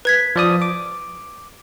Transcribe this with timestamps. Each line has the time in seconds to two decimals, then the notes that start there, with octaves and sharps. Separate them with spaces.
0.05 B4 G#6 B6
0.36 F3 D5 D#6
0.62 D6